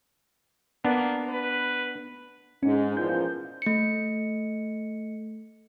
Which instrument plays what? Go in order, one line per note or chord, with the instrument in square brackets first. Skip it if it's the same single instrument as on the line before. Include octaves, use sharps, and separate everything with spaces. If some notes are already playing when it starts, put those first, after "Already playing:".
[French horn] A#3 [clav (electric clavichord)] B3 D4
[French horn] B4
[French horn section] G#2 [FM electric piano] C#4
[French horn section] E2 A#2 F3 [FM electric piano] G6
[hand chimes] A3 C#7